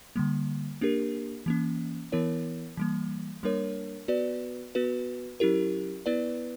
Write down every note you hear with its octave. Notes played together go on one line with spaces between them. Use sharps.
D3 G3 A#3
A#3 D4 G4 A#4
E3 A#3 C#4
E3 B3 E4 A#4 C#5
E3 G3 A#3
G3 A#3 D4 A#4 C#5
B3 F#4 B4 D5
B3 F#4 B4
F#3 C#4 E4 G4 A#4
B3 E4 B4 D5